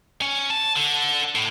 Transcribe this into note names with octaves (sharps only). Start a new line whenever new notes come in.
C#4
A5
D3
A2